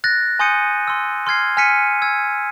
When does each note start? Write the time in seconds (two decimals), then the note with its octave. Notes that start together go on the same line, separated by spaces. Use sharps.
0.04 F#6 A6 A#6
0.39 G#5 C6 D#6 G6 C#7 D#7
0.88 C6 E6
1.27 C6 F6 G#6 C7
1.57 G#5 F6 G#6 B6 C#7 D#7
2.02 E6 G#6